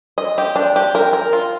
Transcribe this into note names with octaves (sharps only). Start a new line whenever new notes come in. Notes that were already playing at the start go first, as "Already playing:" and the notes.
D#5
G4
D4
G4
A#4
A#4
F4